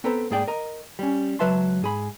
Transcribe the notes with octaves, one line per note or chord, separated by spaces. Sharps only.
B3 C4 A4 B4 C5 A#5
G#2 A#3 G#4 D5 G5
A#4 D#5 A#5
G3 C#4
C#2 F#3 B4 E5 A5 C6
G#2 G#4 B5